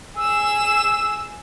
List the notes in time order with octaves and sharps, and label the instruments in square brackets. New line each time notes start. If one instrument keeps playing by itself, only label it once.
[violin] G#4 E7 [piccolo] E6